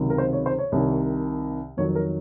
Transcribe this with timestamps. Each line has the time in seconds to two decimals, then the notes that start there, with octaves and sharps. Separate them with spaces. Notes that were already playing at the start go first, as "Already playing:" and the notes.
Already playing: C#2 C3 D#3 F#3
0.10 A#4
0.18 C5
0.33 C#5
0.46 C5
0.59 C#5
0.72 C2 C3 D#3
1.77 F2 D#3 F#3 C#5
1.95 A#4